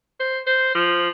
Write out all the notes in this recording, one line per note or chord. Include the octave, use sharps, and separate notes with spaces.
C5
C5
F3